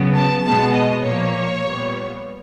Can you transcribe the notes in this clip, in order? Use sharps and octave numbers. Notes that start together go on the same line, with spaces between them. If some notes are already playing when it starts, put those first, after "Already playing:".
Already playing: C#3 F#3 B3
A5
B2 G#3 B3 A5
D#5
A#2 F3 A#3 C#5
A#2 G3 B3